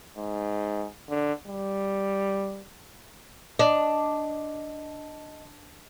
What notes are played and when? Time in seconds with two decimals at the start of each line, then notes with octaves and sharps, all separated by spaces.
0.18 G#2
1.10 D3
1.48 G3
3.59 D4 D#5